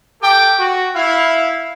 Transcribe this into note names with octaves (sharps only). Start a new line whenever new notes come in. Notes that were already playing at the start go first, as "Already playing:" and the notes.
G4 A4 G5 D6
F#4
E4 F5